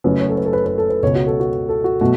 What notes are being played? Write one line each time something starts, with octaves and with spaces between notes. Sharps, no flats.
F#1 F#2 F#3 A3 B4
C#5
A4
B4
A4
B4
B4
A4
B4
C#2 B2 B3 C#5
F#4
A4
F#4
A4
F#4
B2 F#3 A3 F#4